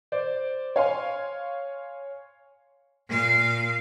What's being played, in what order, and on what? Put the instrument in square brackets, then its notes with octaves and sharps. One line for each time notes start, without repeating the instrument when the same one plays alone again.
[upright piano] C5 D5
C#5 F5 G#5 C6
[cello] A#2 F5